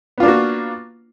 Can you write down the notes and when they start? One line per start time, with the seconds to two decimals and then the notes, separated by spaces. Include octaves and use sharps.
0.18 B3
0.20 F4
0.23 D4
0.25 A#3
0.28 F#4